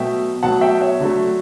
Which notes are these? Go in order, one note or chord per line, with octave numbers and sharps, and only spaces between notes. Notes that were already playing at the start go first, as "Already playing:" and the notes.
Already playing: B2 F#3 A3 E5 G5
B2 F#3 A3 F#5 A5
E5 G5
C#5 E5
D3 F#3 A3